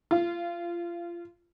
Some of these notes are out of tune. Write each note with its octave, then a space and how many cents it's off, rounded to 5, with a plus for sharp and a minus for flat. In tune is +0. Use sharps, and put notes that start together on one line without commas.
F4 -25